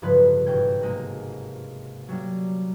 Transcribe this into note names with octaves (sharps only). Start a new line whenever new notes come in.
A1 G2 C#3 F3 B4 C6
G#1 B2 G5 G#6
C3 G#3 A#3
F#3 G3 A#3 D4